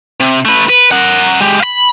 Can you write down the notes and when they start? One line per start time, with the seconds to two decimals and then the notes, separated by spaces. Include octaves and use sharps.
0.20 C3
0.45 A3 B4
0.69 B4
0.91 A#4 F#5
1.40 G#3 G4
1.60 F5 B5